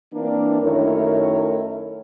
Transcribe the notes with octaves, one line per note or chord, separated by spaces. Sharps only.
E3 A#3 C4 D4
F#2 D#3 A3 E4 A#4 C#5